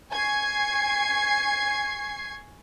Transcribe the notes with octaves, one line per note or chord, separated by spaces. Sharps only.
G#5 C#6 G#6 C7